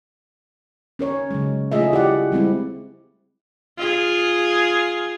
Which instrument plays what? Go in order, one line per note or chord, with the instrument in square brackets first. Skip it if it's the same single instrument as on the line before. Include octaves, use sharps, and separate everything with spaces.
[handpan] C#4 A#4 C#5
C#3 F#3 G#3
A3 F4 G#4 D#5 E5
E4 G4 D5 F#5
G3 G#3 C4 E4
[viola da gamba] F4 G#4